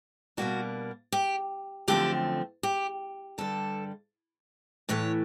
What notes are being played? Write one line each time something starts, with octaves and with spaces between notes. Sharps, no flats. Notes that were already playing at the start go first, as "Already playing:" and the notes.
B2 G3 A#3 D4 F#4
G4
F#2 D3 F3 A3 C4 G4
G4
G2 D3 G3 A4
A2 E3 A3 C#5